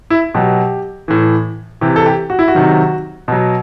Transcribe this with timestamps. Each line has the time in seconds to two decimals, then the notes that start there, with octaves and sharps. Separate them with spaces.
0.10 E4
0.34 B2 F#3 G4
1.08 A2 E3
1.81 C3 E3 G4
1.96 A4
2.06 G4
2.30 F#4
2.39 E4
2.48 F#4
2.55 C3 D#3 F#3
3.28 B2 F#3